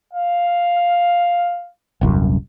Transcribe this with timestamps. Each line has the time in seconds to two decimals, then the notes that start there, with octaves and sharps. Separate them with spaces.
0.13 F5
2.01 D#1 C2 F#2